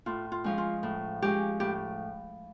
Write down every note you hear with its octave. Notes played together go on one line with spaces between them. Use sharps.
A2 F4
F4
F3 G#3 C#4
F4
A2
F3 G#3 C#4 G4
A2 G4